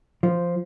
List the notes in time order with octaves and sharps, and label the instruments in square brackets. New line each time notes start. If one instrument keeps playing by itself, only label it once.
[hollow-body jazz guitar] F3